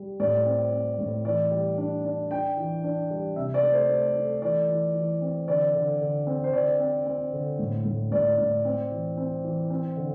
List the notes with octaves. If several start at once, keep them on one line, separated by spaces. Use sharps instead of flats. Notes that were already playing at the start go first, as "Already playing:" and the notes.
Already playing: G3
A2 D5
C4
C4
A2
E3 D5
G3
D4
D4
D4 G5
E3
D4
G3
C3 E5
D5
A3
C5
A3
A3
E3 D5
E3
E3
C4
D3 D5
D3
D3
C4
C5
D3 D5
C4
C4
D3
A2
A2
A2 D5
A2
C4
E3
C4
E3
C4
D3